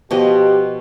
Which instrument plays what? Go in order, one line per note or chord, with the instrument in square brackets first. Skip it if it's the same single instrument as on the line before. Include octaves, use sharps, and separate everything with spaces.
[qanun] B2 F3 D#5 [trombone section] G4